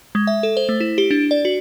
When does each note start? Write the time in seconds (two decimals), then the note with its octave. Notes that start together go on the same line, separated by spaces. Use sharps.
0.15 G#3
0.27 E5
0.43 A4
0.57 C5
0.69 A3
0.80 E4
0.98 G4
1.11 D4
1.31 D5
1.45 F#4